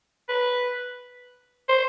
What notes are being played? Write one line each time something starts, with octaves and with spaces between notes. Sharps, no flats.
B4
C5